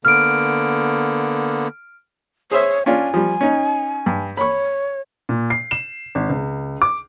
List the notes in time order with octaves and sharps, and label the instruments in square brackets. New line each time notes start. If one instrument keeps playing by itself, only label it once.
[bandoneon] D3 A#3 B3 [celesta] F6 D7
[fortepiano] G#4 C5 E5 [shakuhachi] C#5
[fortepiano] C#4 D4 F4 [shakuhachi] G#5
[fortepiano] F3 G3
C#4 D#4
G2
[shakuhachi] C#5 [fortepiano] B5 C#6
[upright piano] A#2
C7
E7
G#1
C#2
D6